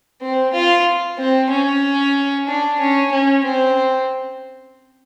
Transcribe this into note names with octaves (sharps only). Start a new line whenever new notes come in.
C4
F4
C4
C#4
D4
C#4
C#4
C4